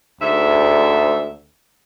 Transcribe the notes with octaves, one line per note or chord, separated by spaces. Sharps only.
D2 G#2 E5